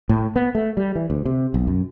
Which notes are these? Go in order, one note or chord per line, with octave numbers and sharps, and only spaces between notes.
A2
B3
A3
G3
E3
D2
C3
B1
F#2